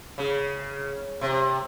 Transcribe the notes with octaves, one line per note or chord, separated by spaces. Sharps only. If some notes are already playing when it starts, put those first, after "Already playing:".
C#3
C3